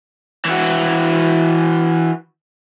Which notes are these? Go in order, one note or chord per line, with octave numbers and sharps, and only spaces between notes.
E3 F#4